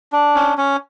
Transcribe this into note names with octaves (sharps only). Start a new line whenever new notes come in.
D4
C#4
C#4